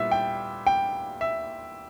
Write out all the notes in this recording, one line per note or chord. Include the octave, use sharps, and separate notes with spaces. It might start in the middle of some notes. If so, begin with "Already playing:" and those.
Already playing: A#2 G3 B3 E4 E5
G5
G5
E5